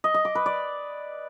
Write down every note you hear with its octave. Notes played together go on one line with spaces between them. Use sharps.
D#5
D#5
D6
B4
D5